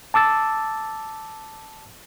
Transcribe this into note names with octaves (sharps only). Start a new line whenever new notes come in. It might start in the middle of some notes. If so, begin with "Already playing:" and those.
A5 D6 E6 A6